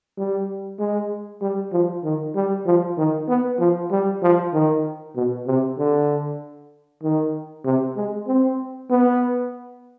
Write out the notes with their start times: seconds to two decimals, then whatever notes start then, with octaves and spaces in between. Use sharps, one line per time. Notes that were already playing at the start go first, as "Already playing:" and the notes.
0.18 G3
0.79 G#3
1.42 G3
1.73 F3
2.04 D#3
2.35 G3
2.66 F3
2.98 D#3
3.29 B3
3.60 F3
3.91 G3
4.23 F3
4.54 D#3
5.16 B2
5.47 C3
5.78 D3
7.03 D#3
7.65 C3
7.96 G#3
8.28 C4
8.90 B3